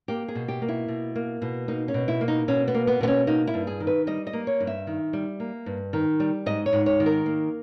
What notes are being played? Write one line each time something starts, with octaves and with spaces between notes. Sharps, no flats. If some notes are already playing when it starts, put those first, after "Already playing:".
A#3 G4
G#4
B2
G4
A#3
E4
B2
A#3
B2
A#3 D#4
C#4
B2
E4
A#3
D#4
B2 C#4
B3
A#3
B3
B2 B3
C#4
A#3 D#4
E4
G2
G#4
D#3
B4
G3 D#5
D#5
A#3
C#5
G2
E5
D#3
G3
A#3
G2
D#3
G3
G#2 D#5
C#5
G#2
C#5
D#3
A#4
A#3